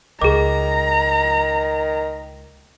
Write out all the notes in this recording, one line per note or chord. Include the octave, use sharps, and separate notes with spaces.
C#2 D#3 G#4 A#5 D6